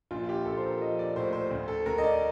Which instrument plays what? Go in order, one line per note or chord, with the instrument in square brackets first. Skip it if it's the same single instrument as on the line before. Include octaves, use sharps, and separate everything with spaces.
[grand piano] A#1 F4
G4
A#1 A4
C5
A#4
F3 D#5
D5
A2 C5
C5
D2
A4
D2 A#4
D#5
D5